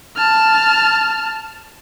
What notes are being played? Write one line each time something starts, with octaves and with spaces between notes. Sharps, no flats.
A5 F6